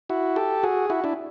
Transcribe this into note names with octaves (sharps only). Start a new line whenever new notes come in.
E4 F#4
G4 A4
F#4 G#4
E4 F#4
D4 E4